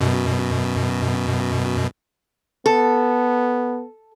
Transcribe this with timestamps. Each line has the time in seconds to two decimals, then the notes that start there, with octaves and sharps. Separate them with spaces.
0.01 F#2 B2
2.66 B3 A4